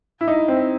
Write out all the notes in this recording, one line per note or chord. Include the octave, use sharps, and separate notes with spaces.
E4
D#4
C4